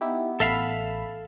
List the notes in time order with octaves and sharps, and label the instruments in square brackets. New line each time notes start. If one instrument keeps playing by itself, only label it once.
[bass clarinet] B3 [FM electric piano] D#4 E4 G4
[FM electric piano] A1 B5 [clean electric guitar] A4 E5 F5